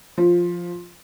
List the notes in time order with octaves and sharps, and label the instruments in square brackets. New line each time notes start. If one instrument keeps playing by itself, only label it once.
[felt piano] F3